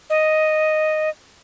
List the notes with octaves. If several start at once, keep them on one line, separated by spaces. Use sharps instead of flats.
D#5